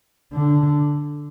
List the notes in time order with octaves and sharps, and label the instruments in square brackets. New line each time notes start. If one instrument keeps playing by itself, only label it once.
[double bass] D3